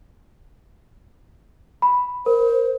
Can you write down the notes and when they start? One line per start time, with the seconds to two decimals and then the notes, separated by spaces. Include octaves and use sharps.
1.82 B5
2.26 A#4 C5